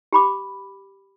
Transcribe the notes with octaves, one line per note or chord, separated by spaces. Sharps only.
G4 B5 D6